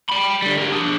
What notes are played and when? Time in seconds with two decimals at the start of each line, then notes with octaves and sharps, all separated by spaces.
0.10 G5 B5
0.42 D3 G3
0.58 G4 A#4
0.72 D4 G#4